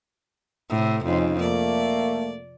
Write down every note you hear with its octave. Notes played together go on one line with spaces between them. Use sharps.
A2 C3
F2 C#3 C#4 D#4
A3 A#3 D5